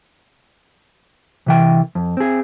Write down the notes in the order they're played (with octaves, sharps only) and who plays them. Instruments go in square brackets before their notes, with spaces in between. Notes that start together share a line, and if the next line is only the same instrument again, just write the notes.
[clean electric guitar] C3 E3 G5
F2
C4 G#4